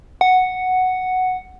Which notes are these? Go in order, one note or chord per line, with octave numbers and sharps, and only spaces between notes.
F#5